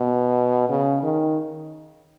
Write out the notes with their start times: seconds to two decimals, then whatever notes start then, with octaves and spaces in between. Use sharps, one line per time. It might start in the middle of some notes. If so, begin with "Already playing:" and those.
Already playing: B2
0.69 C#3
1.02 D#3